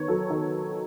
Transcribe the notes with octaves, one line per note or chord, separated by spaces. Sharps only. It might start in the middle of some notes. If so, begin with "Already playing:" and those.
Already playing: D#3 B3 C#5
F#3 A4
D#3